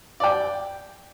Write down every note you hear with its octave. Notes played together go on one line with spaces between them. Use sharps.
D5 G5